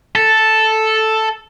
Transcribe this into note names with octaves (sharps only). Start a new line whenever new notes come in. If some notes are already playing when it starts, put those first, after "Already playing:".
A4